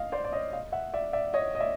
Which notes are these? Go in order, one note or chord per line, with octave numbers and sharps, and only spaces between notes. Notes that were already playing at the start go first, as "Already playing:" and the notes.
Already playing: D#5 F5
C5 D5
D5
C#5 D#5
D#5 F5
E5 F#5
D5 E5
D5 E5
C#5 D#5
D#5
D5 E5